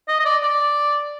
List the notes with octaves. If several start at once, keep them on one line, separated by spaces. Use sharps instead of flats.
D#5
D#5
D5
D5